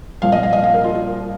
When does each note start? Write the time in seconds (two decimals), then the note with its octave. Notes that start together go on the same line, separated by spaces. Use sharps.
0.22 C2 A#2 F3 F5
0.32 D#5
0.43 F5
0.53 D#5
0.64 F5
0.74 A#4
0.84 F4
0.95 F4